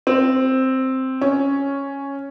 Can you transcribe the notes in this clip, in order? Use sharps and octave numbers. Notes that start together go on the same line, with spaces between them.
C4
C#4